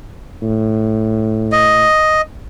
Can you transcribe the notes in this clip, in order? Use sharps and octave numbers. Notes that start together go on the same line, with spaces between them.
A2
D#5